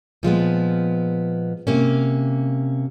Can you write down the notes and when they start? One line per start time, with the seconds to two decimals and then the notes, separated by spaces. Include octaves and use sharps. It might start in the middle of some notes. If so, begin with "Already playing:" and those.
0.23 A#2 F3 G#3 B3
1.67 C3 A#3 C#4